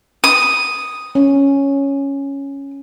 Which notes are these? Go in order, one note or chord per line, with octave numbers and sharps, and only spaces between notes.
D#6
C#4